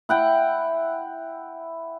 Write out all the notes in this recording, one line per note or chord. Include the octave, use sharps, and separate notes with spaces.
E4 F#5 G5